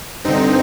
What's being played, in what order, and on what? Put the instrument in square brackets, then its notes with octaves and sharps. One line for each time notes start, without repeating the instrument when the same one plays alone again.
[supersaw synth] G2 D3 C4 D#4